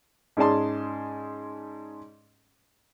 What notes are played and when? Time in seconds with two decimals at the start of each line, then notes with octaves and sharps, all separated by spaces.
0.37 G#2 C#4 G#4 D5 A5 C6